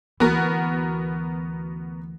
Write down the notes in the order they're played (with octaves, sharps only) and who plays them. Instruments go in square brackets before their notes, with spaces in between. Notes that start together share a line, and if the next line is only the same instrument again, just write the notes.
[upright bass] D2 E3 [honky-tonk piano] B3 F#4 A#4